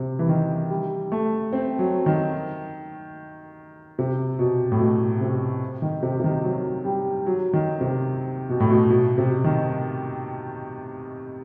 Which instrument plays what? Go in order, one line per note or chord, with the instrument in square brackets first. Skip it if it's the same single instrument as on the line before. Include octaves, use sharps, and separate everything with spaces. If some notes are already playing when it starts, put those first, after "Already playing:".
Already playing: [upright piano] C3
E3
D#3
G3
A3
C4
F#3
D#3
C3
B2
A2
B2
C3
D#3
C3
C3
D#3
F#3
G3
F#3
D#3
C3
B2
A2
B2
B2
C3
D#3